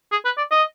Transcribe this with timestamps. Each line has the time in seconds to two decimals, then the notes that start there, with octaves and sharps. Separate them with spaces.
0.12 G#4
0.25 B4
0.37 D5
0.51 D#5